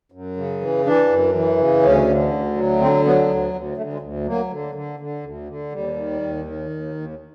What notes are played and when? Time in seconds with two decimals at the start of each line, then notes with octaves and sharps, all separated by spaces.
0.12 F#2
0.37 C#3
0.61 E3
0.85 E3 D4
1.09 F#2
1.35 E3
1.58 C#3
1.82 D2 C#4
2.08 D3
2.32 D2
2.56 F#3
2.80 D3 C4
3.05 F#3 B3
3.29 D2
3.54 D2
3.77 D2 A3
3.93 G#3
4.02 D2
4.27 F#3 A#3
4.51 D3
4.75 D3
5.00 D3
5.23 D2
5.48 D3
5.72 D#2 G3
5.96 D#3
6.21 D#2
6.45 D#3
6.70 D#2
6.95 D#2